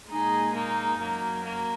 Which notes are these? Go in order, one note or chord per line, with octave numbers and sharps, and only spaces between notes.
A#2 G#3 D#4 G#4
A#3 D#4
F#2 F#3 A#3
A#3